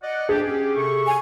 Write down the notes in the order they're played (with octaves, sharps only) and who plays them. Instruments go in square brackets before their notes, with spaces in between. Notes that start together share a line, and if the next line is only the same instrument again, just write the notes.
[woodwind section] D5 D#5 F#5
[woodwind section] D4 G4 [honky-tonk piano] G#4
[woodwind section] C#4 G4
C3 A4 C#6
[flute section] G#5